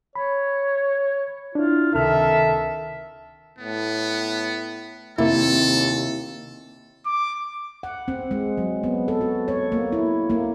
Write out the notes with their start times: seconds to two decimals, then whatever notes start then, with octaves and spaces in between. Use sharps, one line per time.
0.15 C#5 B5
1.55 D4 E4 F4
1.95 C#2 C3 D#3 A4 E5 F6
3.59 A2 B3
5.18 D#2 C3 A#3 E4 A4
7.06 D6
7.83 F#5
8.08 C4
8.31 G#3
8.58 F#3
8.83 B3
9.08 A4
9.21 F#4
9.48 C#5
9.72 A#3
9.92 E4
10.30 A#3